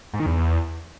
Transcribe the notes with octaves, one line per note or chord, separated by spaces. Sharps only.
G#2
D#3
E2